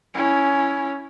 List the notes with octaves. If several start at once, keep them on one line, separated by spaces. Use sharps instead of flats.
C#4 E4